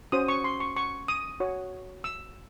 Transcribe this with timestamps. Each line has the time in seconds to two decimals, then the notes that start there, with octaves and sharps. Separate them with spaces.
0.12 C#4 F#4 C5 D#6
0.28 C#6
0.44 C6
0.60 C#6
0.76 C#6
1.08 D#6
1.40 F#4 C#5
2.04 E6